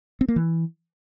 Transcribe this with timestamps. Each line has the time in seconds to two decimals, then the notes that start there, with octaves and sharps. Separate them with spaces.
0.21 C4
0.28 A#3
0.36 E3